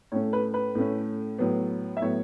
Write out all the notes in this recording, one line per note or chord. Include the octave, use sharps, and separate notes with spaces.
A2 A3 C#4 C#5
B4
B4
A2 A3 C#4
A2 F#3 B3
E5
A2 F#3 B3 C#5